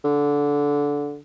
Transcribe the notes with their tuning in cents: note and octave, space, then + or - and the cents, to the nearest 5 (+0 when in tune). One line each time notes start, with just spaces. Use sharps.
D3 -15